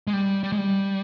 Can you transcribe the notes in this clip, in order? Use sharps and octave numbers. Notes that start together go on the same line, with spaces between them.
G#3
G3
G3
G#3
G3